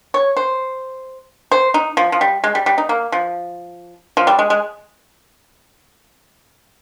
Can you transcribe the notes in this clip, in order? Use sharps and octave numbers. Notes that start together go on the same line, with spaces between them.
C#5
C5
C5
D#4
F3
F3
G3
G#3
G3
G3
D#4
A#3
F3
F3
G3
G#3
G#3